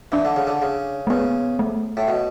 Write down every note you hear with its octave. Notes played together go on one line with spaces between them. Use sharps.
E3 D4
D3
C#3
D3
C#3
A3
C#3 B3
A3
A2
B2